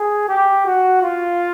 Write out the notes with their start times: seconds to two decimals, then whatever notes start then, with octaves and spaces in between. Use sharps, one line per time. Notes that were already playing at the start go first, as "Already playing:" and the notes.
Already playing: G#4
0.28 G4
0.66 F#4
1.02 F4